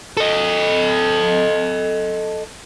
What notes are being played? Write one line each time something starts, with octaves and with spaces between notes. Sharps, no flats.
A4 D#5